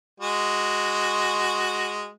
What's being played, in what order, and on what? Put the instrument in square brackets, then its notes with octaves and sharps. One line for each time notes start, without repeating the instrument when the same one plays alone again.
[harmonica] G#3 F#4